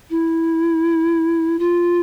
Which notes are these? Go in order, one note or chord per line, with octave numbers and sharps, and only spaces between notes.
E4
F4